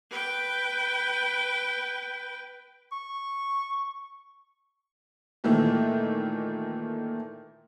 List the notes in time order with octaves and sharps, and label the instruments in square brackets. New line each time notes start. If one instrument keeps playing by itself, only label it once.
[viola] B4 G5
[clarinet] C#6
[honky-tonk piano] A#2 D#3 E3 A3